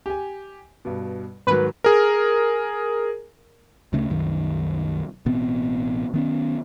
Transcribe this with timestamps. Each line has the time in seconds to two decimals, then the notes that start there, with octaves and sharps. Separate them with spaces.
0.06 G4 G#5
0.85 G2 B2
1.47 G#2 D#3 F#3 B4
1.84 G#4 A#4
3.93 D2 C#3 A3
4.10 C2 F#2 D#3
5.26 A1 B2 B3 C4
6.14 D#3 B3 C#4